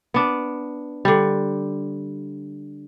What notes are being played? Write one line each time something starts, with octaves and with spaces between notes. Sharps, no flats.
B3 D4
D3 G3